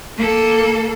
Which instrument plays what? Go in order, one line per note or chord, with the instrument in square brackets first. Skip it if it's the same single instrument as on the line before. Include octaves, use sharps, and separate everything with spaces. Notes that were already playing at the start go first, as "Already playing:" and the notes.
[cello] A#3 A4